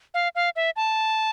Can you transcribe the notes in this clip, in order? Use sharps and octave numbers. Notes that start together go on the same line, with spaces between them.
F5
F5
E5
A5